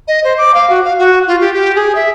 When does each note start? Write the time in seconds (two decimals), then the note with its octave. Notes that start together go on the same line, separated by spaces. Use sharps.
0.08 D#5
0.24 C5
0.38 D6
0.54 F5
0.70 F#4
0.84 F5
0.99 F#4
1.27 F4
1.41 G4
1.54 G4
1.76 G#4
1.95 E5